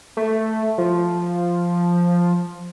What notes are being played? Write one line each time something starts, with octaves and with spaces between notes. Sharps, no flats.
A3
F3